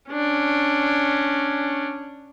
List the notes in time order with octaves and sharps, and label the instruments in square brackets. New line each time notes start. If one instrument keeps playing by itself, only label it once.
[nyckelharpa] C#4 D4